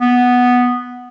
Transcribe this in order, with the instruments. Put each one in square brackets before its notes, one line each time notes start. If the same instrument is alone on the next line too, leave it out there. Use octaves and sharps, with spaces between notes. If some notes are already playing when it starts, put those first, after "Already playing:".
[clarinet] B3